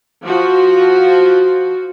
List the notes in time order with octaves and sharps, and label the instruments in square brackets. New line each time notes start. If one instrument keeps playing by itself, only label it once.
[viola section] F3 F#4